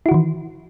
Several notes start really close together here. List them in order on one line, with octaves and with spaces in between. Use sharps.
E4 F#4 D#3 E3